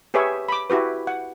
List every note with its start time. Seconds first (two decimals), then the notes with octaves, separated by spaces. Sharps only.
0.14 G4 G#4 B4 C#5 E5
0.49 B5 D6
0.70 E4 F#4 G4 B4
1.07 F#5